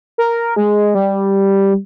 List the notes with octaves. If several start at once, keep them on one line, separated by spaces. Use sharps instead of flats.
A#4
G#3
G3